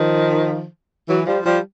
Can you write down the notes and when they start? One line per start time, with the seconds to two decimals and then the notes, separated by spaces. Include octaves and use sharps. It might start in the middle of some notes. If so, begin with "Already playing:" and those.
Already playing: D#3 F3
1.08 E3 F#3
1.26 F3 G3
1.45 F3 G3